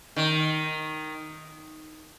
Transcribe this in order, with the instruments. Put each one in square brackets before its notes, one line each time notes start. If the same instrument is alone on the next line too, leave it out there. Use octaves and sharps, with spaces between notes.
[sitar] D#3